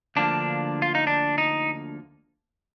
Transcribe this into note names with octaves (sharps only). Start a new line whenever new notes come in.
D2 D3 F3 A#3 D4
F4
D#4
D4
D#4